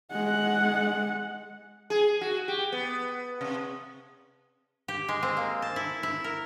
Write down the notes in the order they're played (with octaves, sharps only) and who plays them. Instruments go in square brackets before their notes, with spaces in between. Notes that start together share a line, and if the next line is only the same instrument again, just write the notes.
[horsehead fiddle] G#3 F#5
[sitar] G#4
F#4
G4
B3
C3
[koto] G4
G#3
C4
A#3
A5
E4
E4
A#4